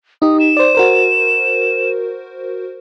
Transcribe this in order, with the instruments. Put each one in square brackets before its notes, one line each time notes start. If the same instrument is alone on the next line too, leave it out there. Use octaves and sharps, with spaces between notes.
[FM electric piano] D#4 G4 D#5 [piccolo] D#6
[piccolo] E7
[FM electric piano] C5 D5
F#4 A#4 C5